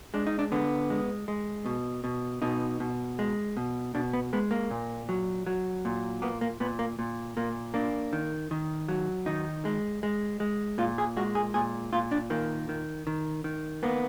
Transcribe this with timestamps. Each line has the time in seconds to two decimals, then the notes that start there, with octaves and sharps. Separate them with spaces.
0.14 G#3 D4
0.27 D#4
0.39 D4
0.52 D3 B3
0.90 G#3
1.28 G#3
1.66 B2
2.04 B2
2.42 B2 D#4
2.80 B2
3.19 G#3
3.57 B2
3.95 B2 D4
4.13 B3
4.33 G#3 B3
4.51 A#3
4.71 A#2
5.09 F#3
5.46 F#3
5.85 A#2
6.22 A#3 B3
6.41 A#3
6.60 A#2 B3
6.79 A#3
6.99 A#2
7.37 A#2 A#3
7.74 A#3 D4
8.13 D#3
8.51 D#3
8.88 F#3
9.26 D#3 D#4
9.65 G#3
10.03 G#3
10.40 G#3
10.78 A#2 F4
10.98 G#4
11.17 G#3 F#4
11.35 G#4
11.54 A#2 G#4
11.93 A#2 F4
12.11 D4
12.30 D#3 A#3
12.69 D#3
13.07 D#3
13.44 D#3
13.83 A#3 B3